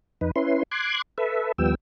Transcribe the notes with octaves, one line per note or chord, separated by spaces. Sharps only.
F2 D#4 B4
C#4 E4 B4 C6
C6 D6 F#6 G#6
A4 B4 E5
D#2 F3 G3 B3 G5 E6